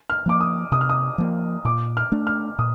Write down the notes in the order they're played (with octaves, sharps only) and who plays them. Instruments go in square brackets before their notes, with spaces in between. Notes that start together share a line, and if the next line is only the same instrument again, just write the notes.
[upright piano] F6
[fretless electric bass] F3 A#3 [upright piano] D6
[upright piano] D#6
[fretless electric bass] C3 [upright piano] D#6
[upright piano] F6
D#6
[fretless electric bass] F3 A#3
[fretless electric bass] A#2 [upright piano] D6
[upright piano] F6
[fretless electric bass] A3 D4
[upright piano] F6
[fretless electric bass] A#2 [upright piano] D#6